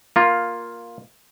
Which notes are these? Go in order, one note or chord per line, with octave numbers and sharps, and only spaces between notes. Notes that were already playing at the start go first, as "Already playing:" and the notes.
A#3 F4